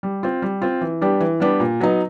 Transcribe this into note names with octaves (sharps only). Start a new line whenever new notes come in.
G3
C4 F4
G3
C4 F4
E3
G3 B3 D4 G4
E3
G3 B3 D4 G4
A#2
F#3 B3 D#4